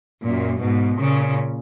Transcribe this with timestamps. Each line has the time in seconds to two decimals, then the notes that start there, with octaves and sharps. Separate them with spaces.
0.23 F#2 A#2
0.60 G#2 B2
0.99 A#2 C#3